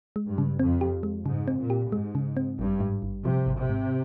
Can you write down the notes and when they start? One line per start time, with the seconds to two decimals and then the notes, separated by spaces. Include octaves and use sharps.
0.16 G#3
0.26 G2
0.38 C#3
0.59 F2 C4
0.81 G4
1.03 G#3
1.26 G#2 C#3
1.48 C4
1.59 A#2
1.70 G4
1.92 G#2 G#3
2.15 C#3
2.37 C4
2.58 G#1 G2
2.80 G#2
3.02 G#1
3.24 C3 F3
3.46 G#1
3.58 C3
3.69 G#2